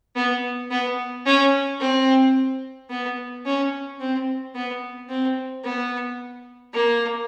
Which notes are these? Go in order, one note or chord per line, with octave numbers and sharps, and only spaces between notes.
B3
B3
C#4
C4
B3
C#4
C4
B3
C4
B3
A#3